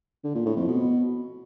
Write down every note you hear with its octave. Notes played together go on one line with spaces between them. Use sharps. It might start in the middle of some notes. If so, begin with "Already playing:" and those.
D3
A#2
A2
F2
B2